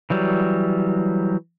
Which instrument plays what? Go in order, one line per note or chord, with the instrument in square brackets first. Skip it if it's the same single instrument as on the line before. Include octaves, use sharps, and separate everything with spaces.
[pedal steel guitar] E3 F#3 G3